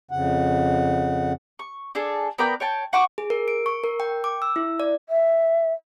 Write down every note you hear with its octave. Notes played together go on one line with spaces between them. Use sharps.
F2 C#3 F#5
C#6
D4 G#4 A4 A5
B3 A#4 D5 G5
C#5 G5 A5
F#5 C#6 D6
G#4
A#4
D7
C#6
A#4
G5
D6
E6
E4
D5
E5